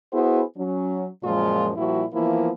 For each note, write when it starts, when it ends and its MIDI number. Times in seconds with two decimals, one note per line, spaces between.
0.12 0.42 59
0.12 0.42 64
0.12 0.42 66
0.12 0.42 68
0.12 0.42 72
0.57 1.07 54
0.57 1.07 61
1.24 1.72 42
1.24 1.72 46
1.24 1.72 53
1.24 1.72 56
1.24 1.72 65
1.77 2.05 46
1.77 2.05 53
1.77 2.05 55
1.77 2.05 64
1.77 2.05 66
2.13 2.50 52
2.13 2.50 53
2.13 2.50 58
2.13 2.50 59
2.13 2.50 64